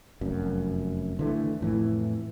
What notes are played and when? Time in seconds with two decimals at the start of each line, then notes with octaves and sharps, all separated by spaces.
0.21 F1 F#2
1.19 D3 E3 A3
1.61 F2 A2 E3